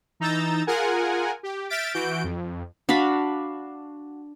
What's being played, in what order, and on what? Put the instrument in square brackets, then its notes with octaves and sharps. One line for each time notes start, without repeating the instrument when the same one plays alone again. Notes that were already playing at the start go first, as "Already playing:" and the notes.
[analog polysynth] E3 D#4 A#5 E6 G6 A6
F4 G#4 A#4 F#5 G#5
G4
E5 F6 G6 A6 B6 D7
E3 F#4 G6 D7
F2
[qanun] D4 F#4 F5 B5